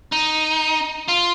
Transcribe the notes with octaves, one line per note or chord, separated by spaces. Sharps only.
D#4
F4